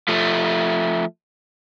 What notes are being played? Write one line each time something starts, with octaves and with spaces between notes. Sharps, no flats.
F3 A3